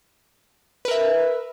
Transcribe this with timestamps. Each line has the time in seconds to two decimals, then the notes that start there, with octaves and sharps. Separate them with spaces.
0.85 B4
0.88 A#4
0.91 E5